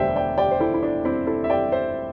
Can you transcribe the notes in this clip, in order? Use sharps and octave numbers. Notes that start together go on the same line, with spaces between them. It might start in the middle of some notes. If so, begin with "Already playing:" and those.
Already playing: E1 D2 D3 G3 D4 C5 E5 G5
D5 G5
D5 G5
C5
E4 A4
E4
D4
C4 E4
E4 A4
E5
D5 G5
C5 E5